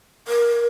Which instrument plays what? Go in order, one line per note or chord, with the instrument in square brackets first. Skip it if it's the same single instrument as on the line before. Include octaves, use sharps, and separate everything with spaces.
[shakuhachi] A#4